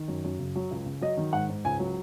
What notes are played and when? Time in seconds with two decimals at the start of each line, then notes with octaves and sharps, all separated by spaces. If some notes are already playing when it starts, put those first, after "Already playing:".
Already playing: D#3
0.08 F#2
0.24 F#2
0.39 C#3
0.56 F#3
0.71 C#2
0.86 C#3
1.01 F#3 D#5
1.17 D#3
1.33 G#2 F#5
1.49 G#2
1.65 C#2 G#5
1.79 F#3